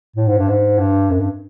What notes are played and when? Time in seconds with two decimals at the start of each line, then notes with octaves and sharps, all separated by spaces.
0.16 A2
0.27 G#2
0.38 G2
0.49 G#2
0.79 G2
1.11 F#2
1.20 G2